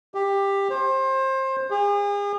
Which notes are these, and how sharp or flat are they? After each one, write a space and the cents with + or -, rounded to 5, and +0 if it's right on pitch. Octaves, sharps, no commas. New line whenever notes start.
G4 +15
C5 +25
G#4 -40